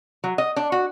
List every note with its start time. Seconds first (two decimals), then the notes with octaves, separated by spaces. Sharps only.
0.24 F#3
0.38 D#5
0.56 D4
0.72 F#4